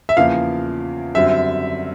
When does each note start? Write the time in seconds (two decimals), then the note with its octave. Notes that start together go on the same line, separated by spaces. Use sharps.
0.09 E5
0.17 E2 C#3 F3 A#3 F5
1.15 F#2 D3 G3 C4 E5